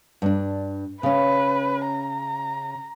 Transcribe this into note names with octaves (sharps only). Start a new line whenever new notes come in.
G2 D4
C#3 C#4 B4
A#5